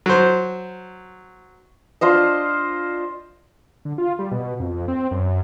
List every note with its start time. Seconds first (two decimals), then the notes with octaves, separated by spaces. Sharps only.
0.06 F#3 C5
2.01 D4 F4 C5 D#5
3.85 D3
3.98 F4
4.19 G3
4.32 B2
4.60 F2
4.88 C4
5.11 F#2